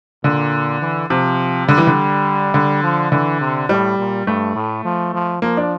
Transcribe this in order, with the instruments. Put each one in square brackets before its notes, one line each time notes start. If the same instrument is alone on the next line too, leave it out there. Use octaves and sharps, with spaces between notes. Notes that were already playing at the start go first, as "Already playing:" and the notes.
[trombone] A#2 [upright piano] D3
[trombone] E3
[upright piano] C3 [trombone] F3
[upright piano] D3 [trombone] G3
[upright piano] E3
D3
D3
[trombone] F3
[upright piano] D3 [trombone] E3
[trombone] C3
[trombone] A2 [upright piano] G3
[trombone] A#2
[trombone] G2 [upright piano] A3
[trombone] A2
F3
F3
[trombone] F3 [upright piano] A#3
[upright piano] D4